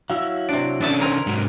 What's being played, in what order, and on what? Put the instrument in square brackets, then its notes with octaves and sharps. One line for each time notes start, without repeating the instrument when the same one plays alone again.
[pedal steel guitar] F#3 E4 [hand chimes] F5
[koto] C3 D4 [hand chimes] D7
[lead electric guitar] D3 C#4 [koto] D4 E5 A5
[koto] C4 G#5 A#5 [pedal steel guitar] A#4
[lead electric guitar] G#2 F#3